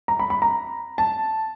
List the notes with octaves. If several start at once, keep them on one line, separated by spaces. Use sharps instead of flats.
A#5
B5
B5
A#5
A5